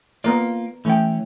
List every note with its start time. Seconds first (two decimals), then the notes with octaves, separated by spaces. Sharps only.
0.24 A#3 B3 F4 A#4 D5
0.85 E3 A3 C#4 G5